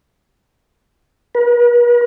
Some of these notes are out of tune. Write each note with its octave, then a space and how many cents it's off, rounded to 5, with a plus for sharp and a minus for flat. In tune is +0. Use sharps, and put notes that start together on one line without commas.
B4 -45